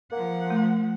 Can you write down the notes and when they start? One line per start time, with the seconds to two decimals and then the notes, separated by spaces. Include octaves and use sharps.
0.12 F3 A#3 F#5
0.50 A3